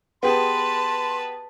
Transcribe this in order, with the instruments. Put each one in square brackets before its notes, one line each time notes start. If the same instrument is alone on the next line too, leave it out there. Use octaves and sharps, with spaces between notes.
[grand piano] B3 G4 G#4 [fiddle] B4 A5 [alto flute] C6